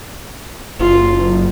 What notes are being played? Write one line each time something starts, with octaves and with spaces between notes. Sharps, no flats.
F#1 F4